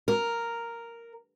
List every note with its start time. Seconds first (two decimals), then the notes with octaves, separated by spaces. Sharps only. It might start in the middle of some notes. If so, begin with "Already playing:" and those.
0.08 A#4